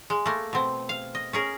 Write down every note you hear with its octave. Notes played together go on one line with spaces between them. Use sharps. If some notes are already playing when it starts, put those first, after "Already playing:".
G#3
A3 A#3
B2 C4
F5
D#5
C#4 G#4 A#4